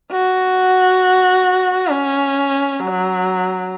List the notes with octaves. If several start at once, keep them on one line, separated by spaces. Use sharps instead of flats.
F#4
C#4
F#3